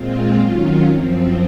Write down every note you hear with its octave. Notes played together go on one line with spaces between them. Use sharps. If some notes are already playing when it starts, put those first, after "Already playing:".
Already playing: A#2 G#3 C4 F4
D#3 F#3 C#4 F4
F#2 F3 C4